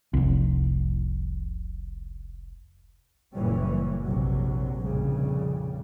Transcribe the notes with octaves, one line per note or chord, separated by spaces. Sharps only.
F1 C2
F#1 A#2 E3 G3 C#4
A#1 C3 F#3
F1 A#1 C#3 G3